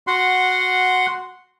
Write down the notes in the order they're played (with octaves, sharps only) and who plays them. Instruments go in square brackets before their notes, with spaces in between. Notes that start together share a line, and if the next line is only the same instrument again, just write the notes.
[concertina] F#4 F#5 C6